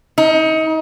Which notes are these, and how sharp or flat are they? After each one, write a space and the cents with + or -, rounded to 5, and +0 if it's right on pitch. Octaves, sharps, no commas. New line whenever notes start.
D#4 +30